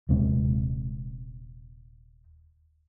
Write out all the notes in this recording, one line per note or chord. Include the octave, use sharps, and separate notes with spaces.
D#1 C3 G#3 C4